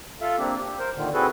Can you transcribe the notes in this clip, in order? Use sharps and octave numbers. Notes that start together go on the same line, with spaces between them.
F4 A4 E5 F5
A#3 C4 D4 G4
G4
A#4 C5
A#2 D3 D#3
C4 E4 F#4 G#4 A4 B4